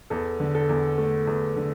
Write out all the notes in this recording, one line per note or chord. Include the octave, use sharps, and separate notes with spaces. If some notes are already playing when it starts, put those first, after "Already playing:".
E2 A4
D3
A4
E2
A3
E2
D3